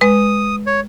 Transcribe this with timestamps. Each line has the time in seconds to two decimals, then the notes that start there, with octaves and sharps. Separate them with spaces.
0.01 G#3 B4 D#6
0.66 C#5